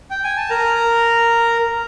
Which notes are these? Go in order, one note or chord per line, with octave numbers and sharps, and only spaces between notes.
G5
G#5
A5
A#4 A#5